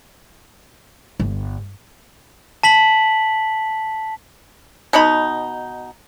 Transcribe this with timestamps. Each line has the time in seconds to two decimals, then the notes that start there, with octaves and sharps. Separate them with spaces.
1.20 G1
2.63 A5 B6 F#7
4.93 B2 B3 D#4 B5